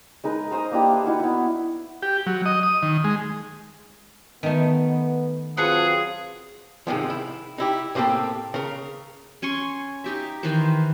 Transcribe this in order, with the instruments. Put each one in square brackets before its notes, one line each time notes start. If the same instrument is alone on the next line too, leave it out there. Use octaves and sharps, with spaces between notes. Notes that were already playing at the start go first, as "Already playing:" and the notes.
[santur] G#3 D#4 A#4 B4
A#4 C5 A#5 D#6
A#3 D4 E4 G4
B4
D#4 E4 F#4 A#4
B3 E4
[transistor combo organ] G4
F#3
D#5
D#6
D#3
G#3
[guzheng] D#3 A3 [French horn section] B3
[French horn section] F#3 C4 F4 [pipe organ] G#4 [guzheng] A4 B4 F#5
[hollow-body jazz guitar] G#2 C3 D#3 F3
E4
D#4 E4 G4
A2 A#3 C4 F#4 G4 A4
C#3 A#4
[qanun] C#4 G#5 C6 C#6
D#4 G4 E5
D#3 E3 B4 C5